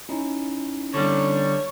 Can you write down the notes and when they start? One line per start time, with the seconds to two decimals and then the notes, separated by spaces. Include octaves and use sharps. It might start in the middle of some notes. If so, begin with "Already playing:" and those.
0.09 C#4 D#4 E4
0.94 D3 G3 C#5